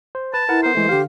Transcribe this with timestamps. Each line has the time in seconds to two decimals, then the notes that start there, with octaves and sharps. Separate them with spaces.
0.15 C5
0.34 B4 A5
0.49 E4 A#4 B4 F#5
0.63 B3 A#4 C5
0.75 E3 G#3 A3
0.89 D3 G4 F5